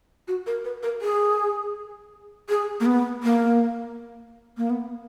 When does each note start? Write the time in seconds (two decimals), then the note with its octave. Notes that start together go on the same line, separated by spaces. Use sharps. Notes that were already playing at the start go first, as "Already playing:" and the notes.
0.28 F#4
0.46 A#4
0.65 B4
0.83 A#4
1.01 G#4
2.49 G#4
2.80 A#3
2.86 B3
3.23 A#3
4.57 A#3
4.70 B3